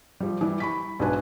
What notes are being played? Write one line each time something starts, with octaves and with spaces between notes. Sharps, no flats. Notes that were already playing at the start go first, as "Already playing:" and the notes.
F3 G3
E3 G3
B5 C#6 B6
B1 G#2 D4 B4 G#5